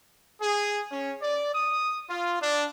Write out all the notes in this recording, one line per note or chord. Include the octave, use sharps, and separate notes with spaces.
G#4
C#4
D5
D#6
F4
D4